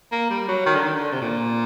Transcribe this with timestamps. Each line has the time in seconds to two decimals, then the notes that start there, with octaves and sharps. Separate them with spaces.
0.12 A#3
0.30 G3
0.48 F#3
0.66 D#3
0.75 D3
0.83 D#3
0.94 D3
1.13 C3
1.22 A#2